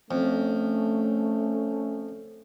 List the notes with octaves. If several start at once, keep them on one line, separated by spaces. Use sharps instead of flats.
F2 A3 C#4